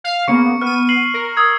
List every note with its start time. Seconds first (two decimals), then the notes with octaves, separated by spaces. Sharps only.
0.04 F5
0.28 C#3 A#3 B3 C#6 C#7
0.62 B3 F6 D#7
0.89 C7 F#7
1.14 A#4
1.37 D#6 E6 G#6